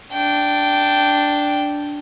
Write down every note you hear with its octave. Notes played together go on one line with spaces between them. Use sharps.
D4 G5